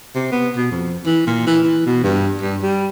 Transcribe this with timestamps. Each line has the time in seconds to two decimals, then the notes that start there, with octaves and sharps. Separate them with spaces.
0.15 C3
0.32 B3
0.56 B2
0.71 F2
1.06 E3
1.27 A#2
1.47 E3
1.63 E3
1.86 B2
2.03 G2
2.42 G2
2.62 G3